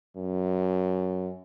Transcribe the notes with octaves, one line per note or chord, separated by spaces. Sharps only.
F#2